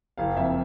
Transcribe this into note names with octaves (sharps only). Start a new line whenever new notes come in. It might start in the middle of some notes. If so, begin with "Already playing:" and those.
F#1 F5
F2 E5